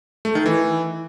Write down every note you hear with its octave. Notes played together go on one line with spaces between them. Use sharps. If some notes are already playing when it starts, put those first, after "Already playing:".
A3
D#3
E3